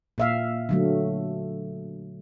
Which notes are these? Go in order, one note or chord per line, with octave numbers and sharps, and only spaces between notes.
A#2 E5 F5
D3 F#3 A3